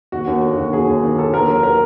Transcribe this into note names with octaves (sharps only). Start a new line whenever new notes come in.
D#2 F#4
D#2
D3
D#2 F#4
D#2 G#4
D#2
D#2
D3 A4
D#2 A#4
F#3
A#4